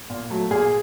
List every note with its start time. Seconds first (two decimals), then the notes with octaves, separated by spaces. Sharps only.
0.10 A#2
0.30 F#3 A3
0.51 A#2 G#4